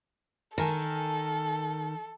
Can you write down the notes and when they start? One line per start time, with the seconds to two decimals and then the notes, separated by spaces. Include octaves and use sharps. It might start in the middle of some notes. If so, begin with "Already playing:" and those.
0.58 D#3 A4 A#4 G#5 A5